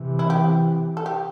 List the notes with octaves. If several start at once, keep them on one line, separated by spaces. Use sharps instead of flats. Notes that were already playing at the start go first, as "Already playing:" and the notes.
Already playing: C3 E3
E4
G4
A4
G4